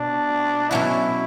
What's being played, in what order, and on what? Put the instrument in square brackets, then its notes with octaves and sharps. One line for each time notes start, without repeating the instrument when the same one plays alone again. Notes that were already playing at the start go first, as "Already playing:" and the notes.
Already playing: [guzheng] B2 [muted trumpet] D4
[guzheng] B2 F#3 C#4 F#4 [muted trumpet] E4